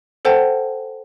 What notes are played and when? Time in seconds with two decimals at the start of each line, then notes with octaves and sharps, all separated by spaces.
0.25 A4 C5 F#5 G5 A5